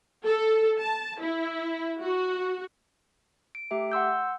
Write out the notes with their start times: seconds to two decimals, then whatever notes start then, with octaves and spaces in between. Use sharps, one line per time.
0.25 A4
0.78 A5
1.20 E4
2.01 F#4
3.55 D7
3.71 A3 G4 E5
3.92 F#5 C6 E6 G6